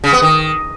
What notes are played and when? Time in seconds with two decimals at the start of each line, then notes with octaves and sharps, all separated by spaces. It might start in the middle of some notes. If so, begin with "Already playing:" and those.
0.04 C#3
0.13 B3
0.22 D#3